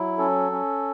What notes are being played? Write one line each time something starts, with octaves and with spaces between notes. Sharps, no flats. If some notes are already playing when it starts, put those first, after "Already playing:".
Already playing: F#3 E4
C#4 A4
C#4